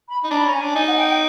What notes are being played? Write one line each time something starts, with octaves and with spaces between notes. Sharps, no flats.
B5
D#4
D4 A#5
B5
C#4 A#5
G#5
D4
D#4 G#5
F#5
G5
G5